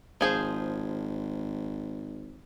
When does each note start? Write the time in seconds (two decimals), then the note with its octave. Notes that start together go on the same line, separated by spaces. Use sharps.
0.21 G#1 F3 G#4 C5